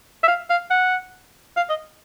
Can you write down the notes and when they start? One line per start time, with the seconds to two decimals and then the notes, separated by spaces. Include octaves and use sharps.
0.23 E5
0.28 F5
0.50 F5
0.71 F#5
1.57 F5
1.70 D#5